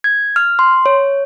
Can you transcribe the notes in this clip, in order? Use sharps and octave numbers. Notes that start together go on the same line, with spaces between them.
G#6
F6
C6
C#5